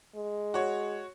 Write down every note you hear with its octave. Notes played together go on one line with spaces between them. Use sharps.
G#3
F#4 C#5